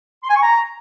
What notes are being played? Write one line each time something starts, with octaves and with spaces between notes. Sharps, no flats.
C6
G#5
C#6
A#5